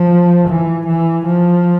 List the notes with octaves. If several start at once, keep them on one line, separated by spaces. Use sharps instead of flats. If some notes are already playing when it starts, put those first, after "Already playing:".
Already playing: F3
E3
E3
F3